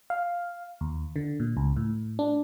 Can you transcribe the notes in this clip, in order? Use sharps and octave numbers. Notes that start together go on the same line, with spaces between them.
F5
D#2
D3
A#2
C#2
A2
D4